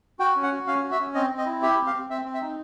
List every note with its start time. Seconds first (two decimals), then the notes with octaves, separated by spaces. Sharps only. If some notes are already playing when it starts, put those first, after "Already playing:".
0.19 F#4 G5
0.36 C#4
0.43 F#5
0.52 F#4
0.67 C#4 F5
0.83 F#4
0.92 E5
0.99 C#4
1.14 C4 D#5
1.30 C4
1.38 D#5
1.46 E4
1.62 G4 E5
1.78 C4
1.87 F5
1.94 C4
2.10 C4 E5
2.25 C4
2.34 E5
2.41 D#4